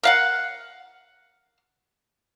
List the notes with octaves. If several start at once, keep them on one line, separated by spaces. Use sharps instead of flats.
A#4 F5 F#5